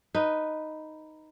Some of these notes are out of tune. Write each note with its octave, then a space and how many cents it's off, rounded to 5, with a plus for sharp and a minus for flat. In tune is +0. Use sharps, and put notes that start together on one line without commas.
D#4 +0 B4 +0